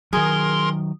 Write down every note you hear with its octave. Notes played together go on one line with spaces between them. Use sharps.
D#3 F#3 G#4 A#4 C6